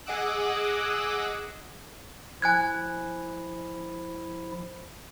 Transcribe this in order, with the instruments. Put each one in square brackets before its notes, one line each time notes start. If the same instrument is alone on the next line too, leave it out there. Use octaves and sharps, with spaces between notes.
[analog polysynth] G#4 D#5 F#5 D6 E6 F#6
[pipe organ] F3 E4 [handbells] G#5 F#6 G#6